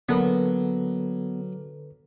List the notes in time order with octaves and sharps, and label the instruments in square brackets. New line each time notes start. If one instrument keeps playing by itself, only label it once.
[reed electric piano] D3 A4 B4 [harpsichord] F#3 [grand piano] A#3 [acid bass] B3